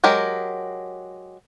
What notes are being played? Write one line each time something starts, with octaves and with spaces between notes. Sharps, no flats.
F#3 G#3 G4 A#4